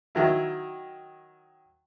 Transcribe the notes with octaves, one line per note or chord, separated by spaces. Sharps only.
D#3 F#3 E4